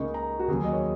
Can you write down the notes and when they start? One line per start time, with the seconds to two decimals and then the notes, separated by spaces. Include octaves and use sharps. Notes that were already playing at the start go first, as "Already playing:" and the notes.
Already playing: C#2 C#3 A#3 D#4 C#6
0.14 A#5
0.39 F#4
0.48 D#2 C#3 F#3 G#4
0.64 D#5
0.73 C#5